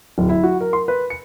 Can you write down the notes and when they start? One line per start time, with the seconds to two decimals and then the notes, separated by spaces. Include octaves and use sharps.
0.18 D1
0.29 E4
0.43 F#4
0.61 A#4
0.73 C6
0.88 B4
1.10 C#7